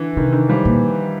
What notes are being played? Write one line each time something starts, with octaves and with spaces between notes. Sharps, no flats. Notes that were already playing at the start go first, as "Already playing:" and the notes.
Already playing: D3 E3
C3 D#3
D#3
F3 G3
A#2